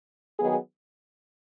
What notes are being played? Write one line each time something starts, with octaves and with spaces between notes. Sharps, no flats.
D#3 F#3 B3 D#4 G#4